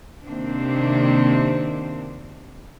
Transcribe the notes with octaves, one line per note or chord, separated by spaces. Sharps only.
C3 D#3 A#3 C4 D4